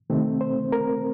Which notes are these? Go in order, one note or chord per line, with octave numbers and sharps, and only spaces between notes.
C3 D#3 A3 C4
C5
A#4